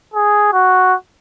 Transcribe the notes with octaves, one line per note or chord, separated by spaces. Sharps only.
G#4
F#4